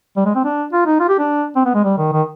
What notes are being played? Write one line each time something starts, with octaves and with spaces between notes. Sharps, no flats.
G3
G#3
C4
D4
F4
D#4
F4
G4
D4
C4
B3
G#3
G3
D#3
D#3